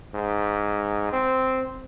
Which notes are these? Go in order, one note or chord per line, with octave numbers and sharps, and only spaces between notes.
G#2
C4